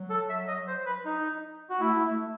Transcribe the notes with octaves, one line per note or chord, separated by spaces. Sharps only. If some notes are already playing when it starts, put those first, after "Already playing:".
Already playing: F#3
A4
E5
D#5
C5
B4
D#4
F#4
A3 E4
A3